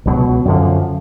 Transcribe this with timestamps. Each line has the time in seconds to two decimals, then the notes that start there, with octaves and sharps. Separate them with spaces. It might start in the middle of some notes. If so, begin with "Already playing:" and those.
0.06 C#2 B2 F#3
0.45 F#2 D3 F3